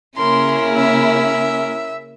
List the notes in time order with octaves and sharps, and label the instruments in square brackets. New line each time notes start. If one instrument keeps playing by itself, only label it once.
[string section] C#3 A#3 E4 [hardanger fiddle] C#4 A#4 [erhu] C6
[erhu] E5